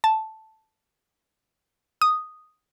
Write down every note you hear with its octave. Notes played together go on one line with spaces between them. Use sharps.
A5
D#6